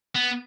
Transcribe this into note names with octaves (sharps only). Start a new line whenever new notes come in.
B3